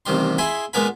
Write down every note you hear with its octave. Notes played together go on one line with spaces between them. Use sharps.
A1 C3 D#3 G3 C6
E4 G#4 D#5 G#5 B5 C6
A#2 G#3 B3 A#4 G#5 B5